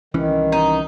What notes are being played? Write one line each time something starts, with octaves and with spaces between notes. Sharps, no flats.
C2 D#3 E3 C#4
D#4